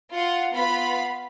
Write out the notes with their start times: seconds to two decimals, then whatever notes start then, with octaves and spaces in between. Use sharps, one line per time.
0.11 F4 F5 F#5
0.53 B3 F4 F5 B5